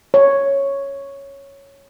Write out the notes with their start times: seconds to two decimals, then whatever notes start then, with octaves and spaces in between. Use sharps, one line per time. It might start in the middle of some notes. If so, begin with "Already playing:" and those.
0.14 C#5